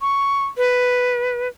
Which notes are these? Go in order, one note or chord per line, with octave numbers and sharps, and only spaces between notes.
C#6
B4